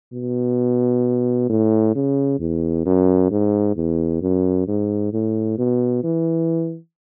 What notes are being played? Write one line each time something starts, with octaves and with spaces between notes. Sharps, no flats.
B2
A2
C#3
E2
F#2
G#2
E2
F#2
G#2
A2
B2
E3